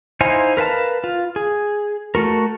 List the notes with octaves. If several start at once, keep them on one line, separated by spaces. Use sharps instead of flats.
D#4 E4 C5 F5 G#5
A#4 B4 F5 A5
F4
G#4
A3 F#4 A#4